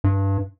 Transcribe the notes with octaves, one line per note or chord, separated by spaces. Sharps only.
G2